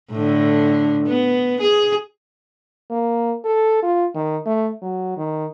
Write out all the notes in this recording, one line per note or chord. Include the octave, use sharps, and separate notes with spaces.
A2 D3
B3
G#4
A#3
A4
F4
D#3
A3
F#3
D#3